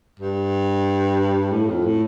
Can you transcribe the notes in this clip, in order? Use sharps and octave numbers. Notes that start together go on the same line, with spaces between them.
G2
A2
F2
A2